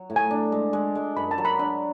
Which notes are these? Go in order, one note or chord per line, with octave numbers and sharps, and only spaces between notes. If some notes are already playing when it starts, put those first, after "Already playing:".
Already playing: F#3
A2
G#5
D4
G#3
G#3
G#3
F#2 B5
A5
F#3
B5
D4 B5